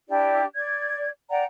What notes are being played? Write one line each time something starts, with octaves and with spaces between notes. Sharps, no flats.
D4 E4 G4 D5
D5 G#6
D5 F#5 G5 A#5